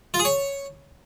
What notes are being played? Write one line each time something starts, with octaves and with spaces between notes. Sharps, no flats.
F4
G#4
C#5